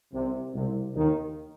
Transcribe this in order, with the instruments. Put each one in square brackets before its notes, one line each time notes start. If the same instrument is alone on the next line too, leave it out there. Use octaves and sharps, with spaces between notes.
[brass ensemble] C2 C3
C2 C3
D#2 D#3